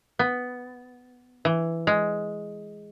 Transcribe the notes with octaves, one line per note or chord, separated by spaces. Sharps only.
B3
E3
G#3